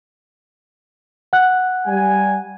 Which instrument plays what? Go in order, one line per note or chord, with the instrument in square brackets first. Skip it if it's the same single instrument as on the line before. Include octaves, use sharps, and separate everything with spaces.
[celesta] F#5 F#6
[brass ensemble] G3 G#5